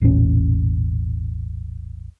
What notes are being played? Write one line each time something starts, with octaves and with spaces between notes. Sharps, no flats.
E1 A1 A#2 C#4